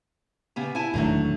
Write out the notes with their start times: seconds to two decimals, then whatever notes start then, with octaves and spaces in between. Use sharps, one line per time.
0.56 C#3 B3 G4
0.75 E4 G#5 A5
0.94 E1 A2 D3 D#3 F#3 A3